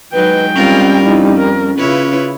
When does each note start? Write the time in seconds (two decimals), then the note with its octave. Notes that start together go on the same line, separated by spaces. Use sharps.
0.13 F#3 G#3 D#4 B4 G5
0.56 G3 C4 C#4 F4 A#4
1.05 F2 D#4 E4
1.38 A#4
1.78 C#3 E4 F4 B4 C#5